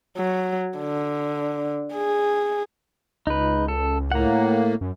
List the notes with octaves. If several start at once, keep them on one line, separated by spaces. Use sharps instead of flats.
F#3
D3
G#4
C#2 D#4 B4
A4
A2 A#3 F#5 A#5
F#2